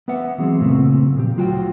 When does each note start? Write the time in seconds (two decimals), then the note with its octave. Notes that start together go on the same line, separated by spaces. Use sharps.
0.08 B3 B4 E5 F#5
0.38 E3 F#3 G#3 B3 C4
0.60 F#2 A#2 C#3 A3 B3 C4
1.16 A#2 F3 G4
1.36 D2 F#3 F4 F#4 G5